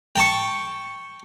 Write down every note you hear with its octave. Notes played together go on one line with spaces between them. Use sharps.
G5 A5 C#6